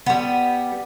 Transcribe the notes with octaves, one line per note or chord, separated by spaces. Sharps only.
G3 B3